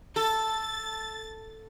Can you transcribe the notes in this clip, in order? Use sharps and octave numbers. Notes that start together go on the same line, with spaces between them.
A4 A6